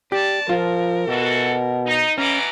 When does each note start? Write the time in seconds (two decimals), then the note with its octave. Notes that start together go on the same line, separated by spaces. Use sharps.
0.12 G4 D5 A5
0.49 F3 F4 A#4
1.08 B2 E3 F#4 A4
1.86 D#4
2.18 B2 E3 C#4 A#5 D6